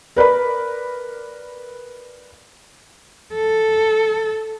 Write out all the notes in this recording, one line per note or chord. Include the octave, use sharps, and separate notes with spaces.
A#4 B4 D5 B5
A4